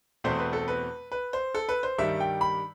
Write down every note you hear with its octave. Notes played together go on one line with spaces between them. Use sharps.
E2 B2 A3 C4 C5
B4
A4
B4
B4
C5
A4
B4
C5
G2 D#3 G3 E5
G5
B5